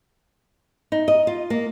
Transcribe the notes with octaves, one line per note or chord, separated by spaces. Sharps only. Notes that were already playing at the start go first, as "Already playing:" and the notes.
D#4
D#5
F4
A#3